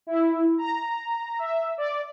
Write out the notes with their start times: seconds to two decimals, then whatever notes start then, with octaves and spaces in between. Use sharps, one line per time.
0.07 E4
0.58 A#5
1.39 E5
1.78 D5